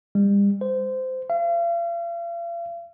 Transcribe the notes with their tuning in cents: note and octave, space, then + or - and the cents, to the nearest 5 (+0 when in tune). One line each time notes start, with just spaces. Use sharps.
G3 +40
C5 -20
F5 -40